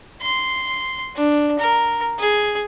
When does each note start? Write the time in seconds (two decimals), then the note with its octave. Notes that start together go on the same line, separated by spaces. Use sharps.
0.21 C6
1.16 D4
1.59 A#4
2.19 G#4